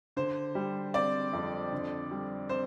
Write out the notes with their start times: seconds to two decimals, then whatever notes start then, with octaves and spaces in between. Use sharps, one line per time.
0.16 D3 C5
0.55 G3
0.94 C4 D5
1.33 F2
1.72 D3
2.11 G3
2.49 C4 C5